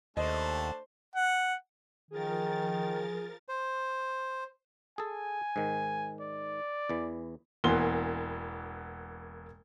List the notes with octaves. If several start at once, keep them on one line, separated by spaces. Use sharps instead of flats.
D#2 A3 D4 C5 D#5 A5
F#5
D#3 F3 G#4 A#4 A6
C5
G#4 A4 G#5
G#2 D#3
D5
E2 E3
E1 E3 A#3 B3 C6 G7